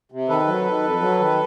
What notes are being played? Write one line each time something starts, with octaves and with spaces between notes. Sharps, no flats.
C3
D#3 A4 B4
F#3
D#3
F2
F#3
D#3